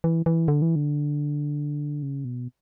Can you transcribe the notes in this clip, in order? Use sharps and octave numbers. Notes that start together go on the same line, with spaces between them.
E3
E3
D3
E3
D3
C#3
B2